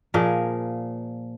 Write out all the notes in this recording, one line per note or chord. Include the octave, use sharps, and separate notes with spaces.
A#2 F3 G#4 A#4